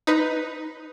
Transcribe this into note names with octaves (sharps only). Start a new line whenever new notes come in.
D#4 B4